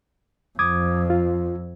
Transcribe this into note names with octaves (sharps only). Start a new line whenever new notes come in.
F2 D6 D#6 G#6
F4